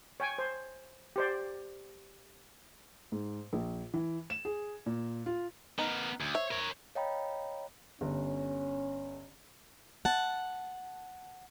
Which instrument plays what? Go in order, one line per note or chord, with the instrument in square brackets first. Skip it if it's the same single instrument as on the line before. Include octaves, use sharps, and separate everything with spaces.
[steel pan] C#5 G5 G#5
C5
G4 C5 D5
[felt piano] G#2
A#1
E3
E7
G#4
A#2
F4
[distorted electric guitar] B3 A#4 [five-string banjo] D#4
[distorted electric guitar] D2
[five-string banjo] C5 E5 [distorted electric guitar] C#5
[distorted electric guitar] A#4 C#5
[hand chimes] C#5 D#5 F5 G5 A#5 B5
[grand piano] G1 [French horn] C#4
[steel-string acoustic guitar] F#5 A5